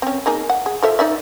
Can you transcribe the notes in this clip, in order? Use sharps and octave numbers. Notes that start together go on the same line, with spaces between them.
C4 C#4
A#3 D#4 G#4
F#5
G#4
F3 A4 E5
D#4 D5 E5